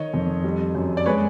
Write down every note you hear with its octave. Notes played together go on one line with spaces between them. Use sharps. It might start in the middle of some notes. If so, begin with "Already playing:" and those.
Already playing: D#3 C#5 D#5
F2
G3
F#2
D5
G#3 B4 C#5